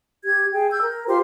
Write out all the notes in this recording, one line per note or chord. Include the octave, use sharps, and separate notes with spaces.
G4 G#6
G#4 G5
E6 G6 G#6
A#4
F4 G4 C5 C6